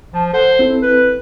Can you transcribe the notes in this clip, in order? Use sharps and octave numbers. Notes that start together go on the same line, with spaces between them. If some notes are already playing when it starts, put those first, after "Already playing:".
F3 A5
A4 C5 F#5
C4 E4 A4
B4